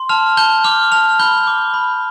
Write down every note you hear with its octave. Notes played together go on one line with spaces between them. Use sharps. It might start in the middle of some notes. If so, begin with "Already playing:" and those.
Already playing: C6
A5 F6 F7
A5 G6 G7
D6 F6 F7
A5 F6 F7
B5 G6 G7
D6
B5